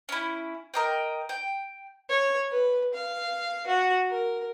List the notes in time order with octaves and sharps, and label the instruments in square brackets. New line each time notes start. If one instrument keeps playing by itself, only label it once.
[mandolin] C#4 E4
A#4 D#5 G5
G5
[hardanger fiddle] C#5
B4
F5
F#4
A#4